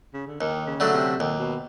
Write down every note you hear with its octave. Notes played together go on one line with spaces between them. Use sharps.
C#3
D3
D#2 D#3
C#3
D3 F#3 A3
C3
D#2 A#2
B2